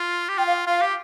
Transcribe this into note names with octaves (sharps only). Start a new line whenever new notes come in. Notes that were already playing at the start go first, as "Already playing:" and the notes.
Already playing: F4
G4
F4 G5
F5
F4 F5
G4